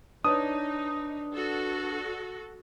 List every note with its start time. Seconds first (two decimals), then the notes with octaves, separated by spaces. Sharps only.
0.24 D4 D#4 B4 C#5 D5 D#6
1.35 F#4 A4